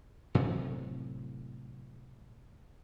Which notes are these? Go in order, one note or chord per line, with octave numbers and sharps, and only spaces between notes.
A2 C3 F#3 A3